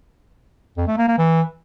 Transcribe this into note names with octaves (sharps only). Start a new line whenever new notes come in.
F2
A3
A#3
A#3
E3